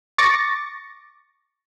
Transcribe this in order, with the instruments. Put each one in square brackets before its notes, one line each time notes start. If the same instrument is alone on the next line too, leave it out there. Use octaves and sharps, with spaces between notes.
[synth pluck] C#6 D6 A6 A#6 C#7